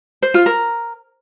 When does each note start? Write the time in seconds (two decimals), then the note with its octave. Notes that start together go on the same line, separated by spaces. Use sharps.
0.22 C5
0.34 F4
0.46 A#4